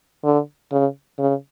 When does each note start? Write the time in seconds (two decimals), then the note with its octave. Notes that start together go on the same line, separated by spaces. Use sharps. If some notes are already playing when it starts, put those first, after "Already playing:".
0.24 D3
0.72 C#3
1.19 C#3